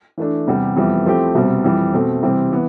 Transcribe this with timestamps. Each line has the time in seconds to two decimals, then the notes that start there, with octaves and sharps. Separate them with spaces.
0.18 E3 A3 D4
0.47 E2 C3 G3
0.76 F2 E3 G3 B3 E4
1.06 F3 A3 C4 E4 G4
1.35 C2 B2 G3 C4
1.64 F2 E3 G3
1.93 B2 A3 C4
2.22 C3 E3 G3 C4
2.52 E3 B3